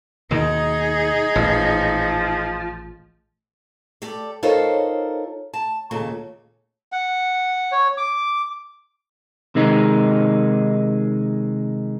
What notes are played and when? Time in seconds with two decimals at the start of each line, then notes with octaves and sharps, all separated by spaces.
0.31 D#2 B2 D#3 D#4 G#4
1.36 A1 A#2 F3
4.02 G4 A4 D5
4.43 D#4 F4 A4 A#4 C5 C#5
5.54 A5
5.91 D#2 A#2 C#3 A4
6.92 F#5
7.72 C#5
7.98 D6
9.55 C3 D#3 G#3 D#4